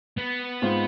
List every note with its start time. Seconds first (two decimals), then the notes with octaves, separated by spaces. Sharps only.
0.17 B3
0.62 G#2 G#3 C4 F4